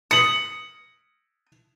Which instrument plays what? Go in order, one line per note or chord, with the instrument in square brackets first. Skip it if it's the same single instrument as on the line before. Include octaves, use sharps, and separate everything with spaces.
[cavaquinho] D#6 [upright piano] C#7 F#7